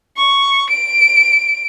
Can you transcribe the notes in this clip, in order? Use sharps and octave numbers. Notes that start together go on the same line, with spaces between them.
C#6
D7